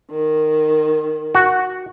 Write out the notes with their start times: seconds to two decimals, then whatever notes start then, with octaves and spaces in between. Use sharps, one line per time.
0.10 D#3
1.35 F#4